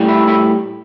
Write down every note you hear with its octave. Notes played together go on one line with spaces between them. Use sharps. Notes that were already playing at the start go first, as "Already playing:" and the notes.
Already playing: A2 G3
E4
E4